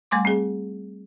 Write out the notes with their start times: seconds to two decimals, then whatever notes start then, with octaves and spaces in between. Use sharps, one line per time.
0.11 G3 A3 G#5 C6 D6
0.25 C4 G#4